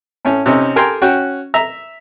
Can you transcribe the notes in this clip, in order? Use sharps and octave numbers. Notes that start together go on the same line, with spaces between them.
A2 C#4
C3 C#4 D#4
G4 A4 A#4 G5 G#5 C6
C#4 F#4 G5
E5 A#5